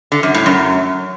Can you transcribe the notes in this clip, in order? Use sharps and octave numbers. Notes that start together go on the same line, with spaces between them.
D3
F#2
A2
F#2